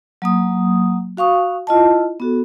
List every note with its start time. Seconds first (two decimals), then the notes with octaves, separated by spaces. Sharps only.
0.22 F#3 A#3 D#6
1.17 F#4 F5 C#6 D#6
1.67 E4 F4 D#5 A5
2.20 B3 F#4 A4